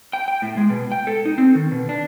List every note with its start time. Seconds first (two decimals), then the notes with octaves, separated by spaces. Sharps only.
0.13 G5
0.28 G5
0.42 A2
0.57 G#3
0.70 B2
0.92 G5
1.07 A4
1.25 D#4
1.38 C4
1.55 D#3
1.72 B2
1.89 D4